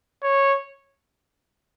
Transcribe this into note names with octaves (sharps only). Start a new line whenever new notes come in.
C#5